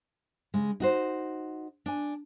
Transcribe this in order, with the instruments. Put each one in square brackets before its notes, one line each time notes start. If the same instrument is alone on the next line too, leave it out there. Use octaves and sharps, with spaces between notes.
[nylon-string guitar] C#3 G#3
D#4 F#4 C5
D4 G#5